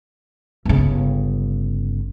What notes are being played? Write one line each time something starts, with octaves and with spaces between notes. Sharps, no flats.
G1 C#3